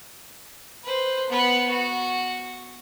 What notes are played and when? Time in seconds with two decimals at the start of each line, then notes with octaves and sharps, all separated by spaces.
0.85 B4 C5
1.30 B3 B4
1.70 F#4